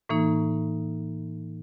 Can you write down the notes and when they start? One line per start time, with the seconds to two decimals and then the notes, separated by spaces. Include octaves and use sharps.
0.09 A2 E3 A#3 D#4